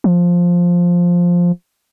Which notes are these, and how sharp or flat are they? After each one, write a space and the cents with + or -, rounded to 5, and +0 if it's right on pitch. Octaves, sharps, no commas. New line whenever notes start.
F3 +5